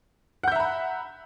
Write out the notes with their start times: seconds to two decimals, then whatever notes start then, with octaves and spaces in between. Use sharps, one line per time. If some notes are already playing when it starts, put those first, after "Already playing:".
0.43 F#5
0.48 G6
0.52 E5
0.56 A#5
0.60 B5